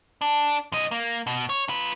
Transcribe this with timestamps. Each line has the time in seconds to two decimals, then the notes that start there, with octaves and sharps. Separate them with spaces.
0.21 D4
0.72 F#2 D#5
0.91 A#3
1.27 B2
1.49 C#5
1.69 F4 B4